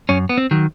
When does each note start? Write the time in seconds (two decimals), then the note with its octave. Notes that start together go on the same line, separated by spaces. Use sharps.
0.09 F#2 C#4
0.29 B3
0.38 C4
0.51 D#3 F#3